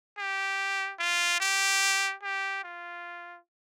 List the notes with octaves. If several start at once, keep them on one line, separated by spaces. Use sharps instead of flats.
G4
F4
G4
G4
F4